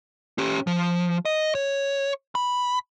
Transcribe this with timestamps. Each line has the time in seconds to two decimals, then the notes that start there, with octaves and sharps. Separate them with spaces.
0.38 C#4 G4
0.67 F3
1.25 D#5
1.55 C#5
2.35 B5